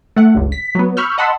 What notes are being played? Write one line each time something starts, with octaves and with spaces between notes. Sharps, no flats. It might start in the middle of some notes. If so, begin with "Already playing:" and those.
A3 F#5
G1 C#2
B6
F#3 B3
B5 C#6 E6 F6 G6
D#5 F#5 A5 B5 C6 E6